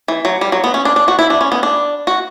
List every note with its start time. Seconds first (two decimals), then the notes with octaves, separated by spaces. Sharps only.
0.08 E3
0.25 F#3
0.41 G3
0.52 F#3
0.64 B3
0.74 C#4
0.85 D4
0.96 D4
1.08 F#4
1.19 E4
1.30 D4
1.41 C#4
1.52 B3
1.63 D4
2.07 F#4